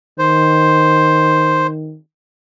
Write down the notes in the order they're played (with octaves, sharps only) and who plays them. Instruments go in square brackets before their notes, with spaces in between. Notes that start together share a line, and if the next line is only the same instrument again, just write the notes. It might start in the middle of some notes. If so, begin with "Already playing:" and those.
[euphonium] D#3 [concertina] C5